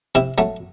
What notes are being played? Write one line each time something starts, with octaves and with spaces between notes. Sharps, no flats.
C3 E4
F#3 A3